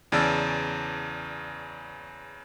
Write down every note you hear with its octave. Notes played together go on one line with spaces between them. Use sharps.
E2 C#3 D5 A5 E6